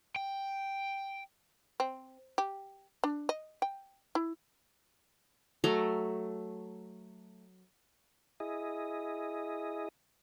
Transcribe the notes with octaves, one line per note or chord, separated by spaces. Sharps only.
G5
C4
G4
D4
D#5
G5
E4
F#3 A3 A#5
E4 G#4 D#5